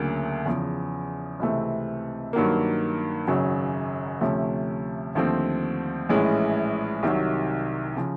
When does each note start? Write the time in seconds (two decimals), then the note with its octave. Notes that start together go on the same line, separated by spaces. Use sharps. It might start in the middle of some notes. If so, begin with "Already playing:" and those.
Already playing: D2 C#3 F#3 A#3 D4
0.46 E2 C#3 F3
1.40 C#2 C3 E3 A3 C4
2.33 G2 D#3 F#3 A#3
3.27 G#1 F#2 C#3 F#3
4.21 D2 C3 F3 A3 C#4
5.15 D#2 D3 F3 A3 C4
6.09 A#1 A2 E3 G#3 C#4
7.03 C2 C3 D#3 F#3
7.97 C#3 F3